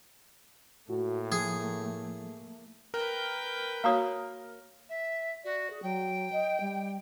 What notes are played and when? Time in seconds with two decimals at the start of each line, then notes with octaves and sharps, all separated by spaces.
0.90 A2 A3 A#3 F#4
1.32 F3 G#4
2.94 A#4 B4 G5
3.84 A#3 F#4 C#5 F5 A#5 D#6
4.89 E5
5.44 F#4 D5
5.70 G#4
5.82 F#3 G5
6.32 D#5
6.60 G3